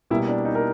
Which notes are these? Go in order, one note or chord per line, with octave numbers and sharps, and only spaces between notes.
B2 G3 A#3 E4
D4
D#4
A#4